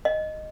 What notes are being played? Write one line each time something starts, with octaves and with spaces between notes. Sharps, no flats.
D#5